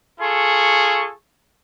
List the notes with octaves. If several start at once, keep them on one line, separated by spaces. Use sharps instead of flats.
F4 G#4 A4 C#6